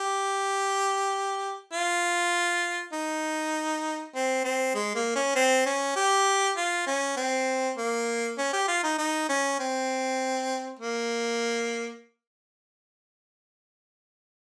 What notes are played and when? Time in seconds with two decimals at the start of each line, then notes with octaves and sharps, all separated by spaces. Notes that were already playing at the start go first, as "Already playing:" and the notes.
Already playing: G4
1.73 F4
2.93 D#4
4.15 C4
4.44 C4
4.75 G#3
4.95 A#3
5.16 C#4
5.36 C4
5.66 C#4
5.96 G4
6.57 F4
6.87 C#4
7.17 C4
7.78 A#3
8.38 C#4
8.53 G4
8.68 F4
8.84 D#4
8.98 D#4
9.29 C#4
9.59 C4
10.79 A#3